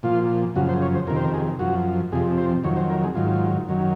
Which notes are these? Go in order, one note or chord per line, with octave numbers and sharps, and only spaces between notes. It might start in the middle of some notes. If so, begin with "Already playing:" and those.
A#2 F3 F4
F#2 C#3 F3 F#4
C5
C#5
C5
F2 C3 D#3 A#4
C5
A#4
G#4
F#2 F3 F#4
F2 C3 F3 G#4
C5
F2 D#3 F#3 C#5
C5
A#4
G#4
G#2 D#3 F#3 F4
F#2 D#3 F#3